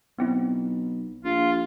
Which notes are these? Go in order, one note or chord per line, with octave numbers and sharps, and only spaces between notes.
B1 B3 C4 E4
A#1 F4